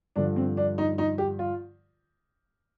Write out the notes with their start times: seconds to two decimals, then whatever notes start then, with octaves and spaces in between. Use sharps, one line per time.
0.16 G2 D3 F3 D4
0.36 C4
0.57 D4
0.78 D#4
0.98 D#4
1.18 G4
1.39 F4